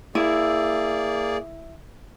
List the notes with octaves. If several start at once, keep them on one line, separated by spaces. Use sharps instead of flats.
A#3 E4 G#4 D5